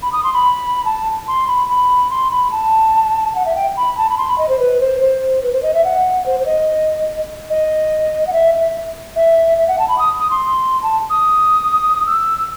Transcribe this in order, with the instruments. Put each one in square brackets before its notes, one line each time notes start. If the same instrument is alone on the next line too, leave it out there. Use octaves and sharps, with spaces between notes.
[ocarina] B5
D#6
C6
B5
A5
C6
B5
B5
C6
B5
A5
F#5
E5
G5
B5
A5
B5
C6
B5
D#5
C5
B4
C5
C5
B4
C5
D#5
E5
F#5
C5
C5
D#5
D#5
F#5
E5
E5
E5
E5
F#5
A5
B5
D#6
D#6
C6
A5
D#6
E6